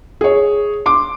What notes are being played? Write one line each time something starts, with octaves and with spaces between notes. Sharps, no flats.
G#4 C#5
C6 D6